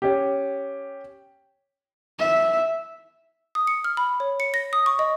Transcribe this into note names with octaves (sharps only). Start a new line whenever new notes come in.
C#4 G4
E5
D#6
C#7
F6
B5
C#5
C#7
A#6
D#6
C#6
D#5